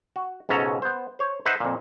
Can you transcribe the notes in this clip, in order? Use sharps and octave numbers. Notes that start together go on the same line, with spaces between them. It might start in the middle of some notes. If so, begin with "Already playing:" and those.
F#4
C#2 G#2 B2 C#4 A4 A#5
B3 C5
C5 C#5
D#4 B4 C5 E5 F#5
F2 A#2